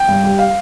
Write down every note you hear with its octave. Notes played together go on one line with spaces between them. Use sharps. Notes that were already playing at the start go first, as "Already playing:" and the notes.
Already playing: G5
G2
G3
F5